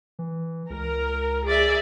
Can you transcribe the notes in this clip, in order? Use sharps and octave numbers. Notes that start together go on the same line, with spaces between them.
E3
C#2 A#4
G#4 D5 E5